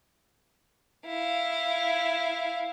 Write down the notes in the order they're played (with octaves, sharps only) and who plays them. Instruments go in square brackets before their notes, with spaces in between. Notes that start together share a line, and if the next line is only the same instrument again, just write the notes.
[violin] E4 F5